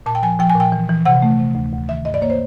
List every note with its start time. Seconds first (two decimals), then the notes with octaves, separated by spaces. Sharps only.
0.06 A#2 A5
0.15 G5
0.23 F3 G#5
0.39 F3 G5
0.50 G#5
0.55 A#2 G5
0.72 E3
0.89 E3
1.05 C3 F#5
1.22 A3
1.39 C3
1.55 D2
1.72 D2
1.88 D#3 E5
2.05 G2 D#5
2.14 D5
2.22 A#3 C#5
2.30 C5